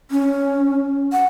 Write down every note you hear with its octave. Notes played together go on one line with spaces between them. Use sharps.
C#4
F#5